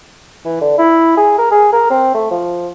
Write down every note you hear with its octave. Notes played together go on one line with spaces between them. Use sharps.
E3
D3
E4
G#4
A#4
G#4
A#4
C4
A3
F3